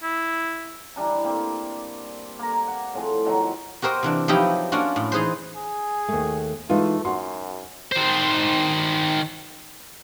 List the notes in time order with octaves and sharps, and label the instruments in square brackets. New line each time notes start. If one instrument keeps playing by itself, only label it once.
[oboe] E4
[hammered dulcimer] E3 G3 D4 A#5
A#3 C4
A#3 A#5
F#5
A2 F3 C4 G#4
B2 D#3 F3 F#3
[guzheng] F#4 G4 A#4 C5 D#5
C3 E3 D4
F3 F#3 D#4 E4 G4
A#3 C#4 D4 F4 F#4
A2
E3 D#4 G#4 B4 C5
[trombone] G#4
[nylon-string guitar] D#2 A3
[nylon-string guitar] E3 G#3 D#4 [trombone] A3 [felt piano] F4
[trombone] F#2 [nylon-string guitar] F#4 [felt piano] C6
[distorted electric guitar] D#3 C5